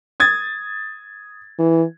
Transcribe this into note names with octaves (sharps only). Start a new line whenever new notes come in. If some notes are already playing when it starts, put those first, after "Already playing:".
D#6 G#6 A6
E3